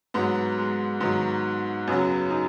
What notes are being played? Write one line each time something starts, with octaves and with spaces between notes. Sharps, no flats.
G#2 F#3 B3
G#3
G#2 D#3 F#3 B3
F#2 C#3 F#3 B3
D#4